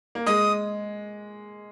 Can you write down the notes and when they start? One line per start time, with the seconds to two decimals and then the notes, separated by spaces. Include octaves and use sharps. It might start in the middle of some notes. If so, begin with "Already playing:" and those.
0.15 A#3
0.26 G#3 D#6